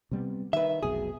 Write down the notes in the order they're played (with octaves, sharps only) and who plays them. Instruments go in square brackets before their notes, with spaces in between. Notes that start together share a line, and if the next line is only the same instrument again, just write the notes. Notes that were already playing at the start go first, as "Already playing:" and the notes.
[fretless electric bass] C3 G3 B3
[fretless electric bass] D#3 [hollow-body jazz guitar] B4 E5
[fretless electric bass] F1 B1 B2 [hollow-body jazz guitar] G#4